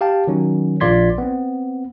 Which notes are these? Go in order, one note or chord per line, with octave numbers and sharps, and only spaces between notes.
G4 F5 G5 A5
D#3 F#3 C#4
A#1 F4 D5 C6 G#6 B6
B3 C4